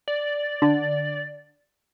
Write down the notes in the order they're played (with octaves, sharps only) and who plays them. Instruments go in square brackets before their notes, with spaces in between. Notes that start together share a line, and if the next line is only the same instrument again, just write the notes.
[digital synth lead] D5
[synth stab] D3